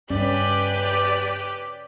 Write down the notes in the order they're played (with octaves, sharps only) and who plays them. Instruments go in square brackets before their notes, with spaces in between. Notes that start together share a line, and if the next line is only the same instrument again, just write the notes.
[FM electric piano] G2 [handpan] C#4 [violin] G4 B4 [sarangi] D5